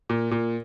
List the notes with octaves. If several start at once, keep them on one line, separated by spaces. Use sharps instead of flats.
A#2
A#2